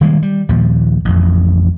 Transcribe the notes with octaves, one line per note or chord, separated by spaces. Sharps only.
D#3 G3 G#3 A#3
G3
D#2 A#2 F3
A1 F2